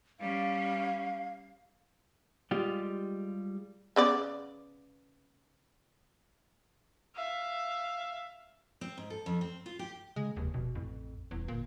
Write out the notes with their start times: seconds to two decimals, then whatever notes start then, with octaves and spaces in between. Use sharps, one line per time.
0.20 G3 C#4 F5
2.51 G3 G#3 F4 G4
3.96 C#3 B3 D5
7.15 E5 F5
8.81 C4
8.98 G#2
9.10 A4
9.26 F2
9.41 C4
9.66 F4
9.79 G4
10.16 C#3 G#3
10.36 F1 D#2
10.54 F1 B2
10.75 A1 F2
11.31 D#1 E2
11.48 G1 A#2